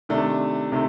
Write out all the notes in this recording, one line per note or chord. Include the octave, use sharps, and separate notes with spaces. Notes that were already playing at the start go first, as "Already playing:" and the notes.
C3 D#3 A3 D4
C3 D#3 A3